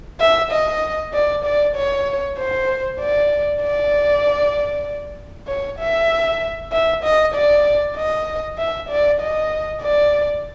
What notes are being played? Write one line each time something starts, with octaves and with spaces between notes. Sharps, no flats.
E5
D#5
D5
D5
C#5
C5
D5
D5
C#5
E5
E5
D#5
D5
D#5
E5
D5
D#5
D5